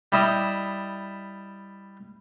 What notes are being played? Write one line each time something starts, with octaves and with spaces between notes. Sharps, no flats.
G3 E4 D#5 E5